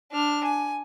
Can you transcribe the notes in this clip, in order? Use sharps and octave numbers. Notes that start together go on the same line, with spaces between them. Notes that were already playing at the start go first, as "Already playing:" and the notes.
D4 F6
G#5